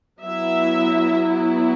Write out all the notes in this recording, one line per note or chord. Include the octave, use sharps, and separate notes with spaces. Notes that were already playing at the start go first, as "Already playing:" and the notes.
F#3 B3 E4 E5